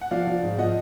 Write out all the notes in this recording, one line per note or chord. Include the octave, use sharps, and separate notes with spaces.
F#5
F3 D5 F5
F3
G#2
F3 D#5 F#5